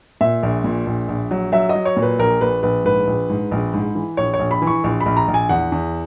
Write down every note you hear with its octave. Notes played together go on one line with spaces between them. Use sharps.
A#2 E5
A#1
A#2
A#1
A#1
F#3
F#3 E5
D#5
F#3
C#5
A#2
B4
A#1 A#4
A#1 B4
A#1 B4
G#2 B4
A#1
G#2
A#1
G#2
E3
A#1 C#5
C#5
A#1
B5
E3
C#6
A#1
B5
A#1
A#5
A#1
G#5
E2 F#5
E2